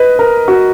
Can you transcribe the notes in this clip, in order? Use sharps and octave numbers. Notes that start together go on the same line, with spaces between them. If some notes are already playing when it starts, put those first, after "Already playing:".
Already playing: B4 D#5
A#4
F#4